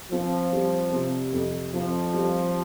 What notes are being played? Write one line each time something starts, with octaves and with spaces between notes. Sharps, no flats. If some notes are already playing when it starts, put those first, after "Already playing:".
F3 C4
G3
C3
F2
F3 C4
G3